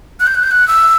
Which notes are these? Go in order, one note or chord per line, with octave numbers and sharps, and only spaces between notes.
F#6
G6
F#6
G6
F#6
E6